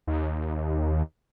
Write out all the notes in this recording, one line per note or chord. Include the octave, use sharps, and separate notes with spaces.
D#2